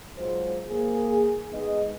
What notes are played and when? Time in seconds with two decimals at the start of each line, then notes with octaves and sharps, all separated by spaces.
0.16 F#3 G#3 D#4 F4 C5
0.69 A#3 G#4
1.52 G#3 B3 D#4 G#4 D#5